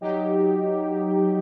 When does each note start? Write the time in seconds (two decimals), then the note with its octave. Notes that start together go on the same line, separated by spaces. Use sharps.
0.01 F#3 D#4 G4